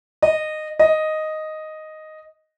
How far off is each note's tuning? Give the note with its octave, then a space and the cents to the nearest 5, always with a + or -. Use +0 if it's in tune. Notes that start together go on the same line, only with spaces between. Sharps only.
D#5 -15
D#5 +0